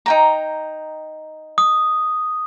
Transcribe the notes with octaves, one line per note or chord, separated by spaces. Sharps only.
D#4 G5 A#5
D#6